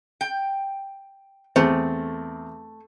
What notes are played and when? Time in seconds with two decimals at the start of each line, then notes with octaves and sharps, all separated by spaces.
0.21 G5
1.56 E2 A3 C4